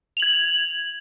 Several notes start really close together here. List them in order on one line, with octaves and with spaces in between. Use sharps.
F7 F#7 G#6